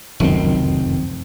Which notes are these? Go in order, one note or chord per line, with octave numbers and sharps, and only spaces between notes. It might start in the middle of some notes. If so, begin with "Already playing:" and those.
F1 C#2 F#2 D#3 C4